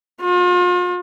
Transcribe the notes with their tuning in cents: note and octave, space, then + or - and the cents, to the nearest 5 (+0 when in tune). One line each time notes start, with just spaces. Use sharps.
F4 +40